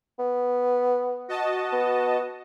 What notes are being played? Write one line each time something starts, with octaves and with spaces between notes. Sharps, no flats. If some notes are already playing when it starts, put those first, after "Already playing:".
B3
F#4 D#5 A5
B3